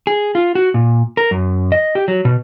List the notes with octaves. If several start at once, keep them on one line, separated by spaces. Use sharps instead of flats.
G#4
F4
F#4
A#2
A#4
F#2
D#5
G4
F#3
B2